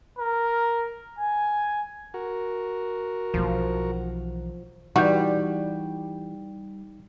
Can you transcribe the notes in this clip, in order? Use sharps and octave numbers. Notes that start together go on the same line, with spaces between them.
A#4
G#5
F#4 A#4
B1 E3 F3
E3 G3 D#4 F#4 G6